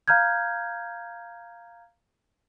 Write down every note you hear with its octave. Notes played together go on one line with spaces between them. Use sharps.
F5 A#5 F6 G6 G#6